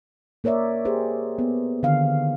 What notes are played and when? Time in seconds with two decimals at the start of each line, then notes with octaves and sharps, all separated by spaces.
0.44 A#3 A#4 C#5 D5 E5
0.85 G4 G#4 C5
1.38 B3
1.83 D3 D#3 F5